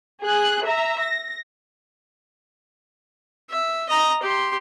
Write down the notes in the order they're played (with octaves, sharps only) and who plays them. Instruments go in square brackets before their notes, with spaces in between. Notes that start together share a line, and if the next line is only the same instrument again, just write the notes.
[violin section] G#4 F#6
E5 A#5
A#6
[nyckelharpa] E5
D#5 A#5
G4 C6